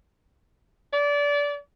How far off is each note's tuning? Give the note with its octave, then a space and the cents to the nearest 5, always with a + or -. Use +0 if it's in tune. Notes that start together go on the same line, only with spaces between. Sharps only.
D5 -25